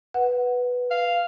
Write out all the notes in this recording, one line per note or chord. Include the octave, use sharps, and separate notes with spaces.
B4 F#5
F5